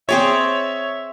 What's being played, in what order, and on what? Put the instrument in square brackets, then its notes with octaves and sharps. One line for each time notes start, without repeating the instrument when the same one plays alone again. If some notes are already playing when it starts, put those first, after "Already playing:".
[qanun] C4 G#4 D5 [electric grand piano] C#5 [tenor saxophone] E5